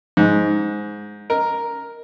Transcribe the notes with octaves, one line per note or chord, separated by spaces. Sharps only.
G#2
A#4